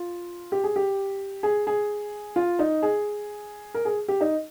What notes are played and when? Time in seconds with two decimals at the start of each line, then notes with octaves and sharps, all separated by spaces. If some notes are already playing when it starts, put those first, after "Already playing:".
Already playing: F4
0.52 G4
0.64 G#4
0.76 G4
1.43 G#4
1.67 G#4
2.36 F4
2.59 D#4
2.83 G#4
3.74 A#4
3.85 G#4
4.08 G4
4.21 D#4